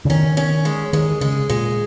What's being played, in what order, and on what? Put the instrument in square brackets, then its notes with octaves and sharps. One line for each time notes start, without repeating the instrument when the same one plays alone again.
[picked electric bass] C#3
[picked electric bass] D#3 [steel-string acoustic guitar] C#4
[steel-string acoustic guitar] C#4
G#3
[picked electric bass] D#3 [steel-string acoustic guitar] G#3
[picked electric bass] C#3 [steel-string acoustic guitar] G#3
[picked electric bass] A#2 [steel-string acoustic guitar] G#3